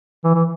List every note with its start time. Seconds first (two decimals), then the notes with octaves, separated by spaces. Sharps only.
0.24 E3
0.35 E3